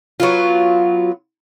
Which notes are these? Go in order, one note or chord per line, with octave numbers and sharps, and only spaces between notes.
F#3 B3 F4